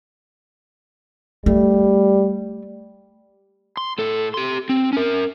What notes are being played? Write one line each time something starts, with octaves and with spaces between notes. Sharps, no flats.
G3 A3
C6
A2 A4
G4 C6
C4
C#4 A#4